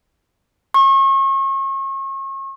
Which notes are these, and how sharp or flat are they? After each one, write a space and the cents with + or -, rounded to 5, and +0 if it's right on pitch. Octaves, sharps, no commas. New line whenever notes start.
C#6 -35